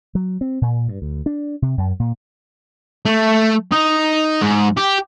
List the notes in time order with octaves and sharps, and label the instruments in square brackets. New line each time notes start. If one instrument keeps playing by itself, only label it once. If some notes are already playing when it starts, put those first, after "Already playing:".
[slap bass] F#3
C4
A#2
G2
D2
D4
C3
F#2
A#2
[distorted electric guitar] A3
D#4
G#2
G4